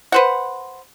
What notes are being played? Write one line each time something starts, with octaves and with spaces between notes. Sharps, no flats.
B4 C5 F#5